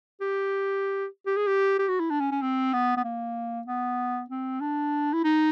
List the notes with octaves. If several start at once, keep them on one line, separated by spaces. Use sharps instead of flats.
G4
G4
G#4
G4
G4
F#4
E4
D4
C#4
C#4
C4
B3
B3
A#3
B3
C4
D4
E4
D#4